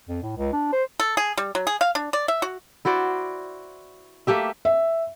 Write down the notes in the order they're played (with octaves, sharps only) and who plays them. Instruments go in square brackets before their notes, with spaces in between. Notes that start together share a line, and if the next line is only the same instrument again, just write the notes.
[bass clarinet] F2
A2
C#2
D4
C5
[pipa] A4
G#4
G3
F#3
G#4
F5
D4
D5
E5
F#4
[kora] E4 F#4 C5 D5
A3 A#3 G4 E5
[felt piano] E5